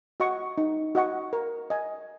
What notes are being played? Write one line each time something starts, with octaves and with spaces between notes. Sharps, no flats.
F#4 D#5 F#5 C#6
D#4
F#4 D#5 F#5 C#6
A#4
D#5 G#5